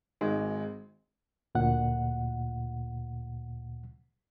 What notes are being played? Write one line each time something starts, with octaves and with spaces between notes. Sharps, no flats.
G#1 G#3
D2 A#2 F#5